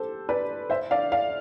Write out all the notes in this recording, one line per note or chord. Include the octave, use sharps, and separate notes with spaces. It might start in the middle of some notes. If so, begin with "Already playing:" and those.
Already playing: G4 A4 C5
B4 D5
C5 E5
D5 F5
D5 F5